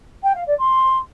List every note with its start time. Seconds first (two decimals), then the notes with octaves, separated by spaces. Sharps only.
0.23 G5
0.35 F5
0.46 D5
0.58 C6